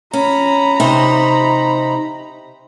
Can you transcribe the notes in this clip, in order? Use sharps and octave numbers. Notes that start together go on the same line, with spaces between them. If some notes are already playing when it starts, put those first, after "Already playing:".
C#4 A#5 B5
C3 D#4 C5